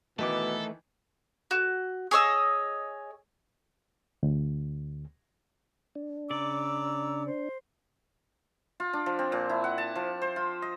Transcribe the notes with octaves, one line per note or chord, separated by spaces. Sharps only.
B2 D#3 E3 A3 D#4 A4 B4 D6
F#4
G#4 C#5 D#5 E6
D2
D4
C#3 D5 A#5 D6 E6
C5
F4
D4
F3
C4
A#2
E4
F#5
A5
F3
C5
F4
D#5